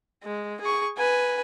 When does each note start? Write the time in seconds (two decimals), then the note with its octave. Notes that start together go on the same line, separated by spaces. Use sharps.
0.24 G#3
0.61 G#4 C#6
0.97 B4 G#5